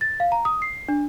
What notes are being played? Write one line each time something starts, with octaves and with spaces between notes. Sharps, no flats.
A6
F5
A#5
D#6
C7
D4